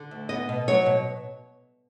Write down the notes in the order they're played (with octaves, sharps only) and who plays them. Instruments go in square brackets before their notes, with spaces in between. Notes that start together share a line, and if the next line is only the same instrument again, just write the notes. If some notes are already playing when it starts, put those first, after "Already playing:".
Already playing: [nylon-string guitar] D3
D2
B3 D#5
B2
F#3 C#5
B2